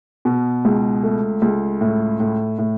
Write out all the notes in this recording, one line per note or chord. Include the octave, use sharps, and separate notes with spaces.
B2
C#2
A3
C#2
A2
A2
A2